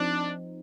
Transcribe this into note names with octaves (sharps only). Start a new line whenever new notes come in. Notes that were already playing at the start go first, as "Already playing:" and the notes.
Already playing: F3 C4 D4 D#4